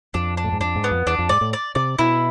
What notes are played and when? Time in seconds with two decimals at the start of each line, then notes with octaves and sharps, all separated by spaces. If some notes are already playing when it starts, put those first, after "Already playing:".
0.14 F2 D4
0.37 D4
0.44 A2
0.53 G#2
0.60 F2 D4
0.76 G#2
0.84 B3
0.91 F2
1.06 E2 D4
1.19 F2
1.29 G#2 D5
1.41 A2
1.53 D5
1.75 C3 D5
1.99 B2 E4